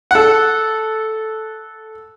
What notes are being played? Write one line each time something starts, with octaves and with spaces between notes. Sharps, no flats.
A4 F#5